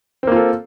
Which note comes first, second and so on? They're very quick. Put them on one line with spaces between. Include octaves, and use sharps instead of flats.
C4 A#3 F4 A4